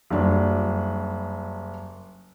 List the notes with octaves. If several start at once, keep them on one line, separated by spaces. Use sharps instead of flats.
F#1 G2 F#3 D4